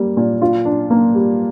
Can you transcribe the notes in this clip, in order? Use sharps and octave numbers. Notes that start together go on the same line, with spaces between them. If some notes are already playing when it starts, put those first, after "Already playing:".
Already playing: G3 A#3
A#2
F4
D4
A#3
G3